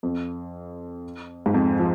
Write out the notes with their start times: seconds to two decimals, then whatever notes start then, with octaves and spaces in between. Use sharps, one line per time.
0.03 F2
1.46 G#2
1.54 F2
1.79 F3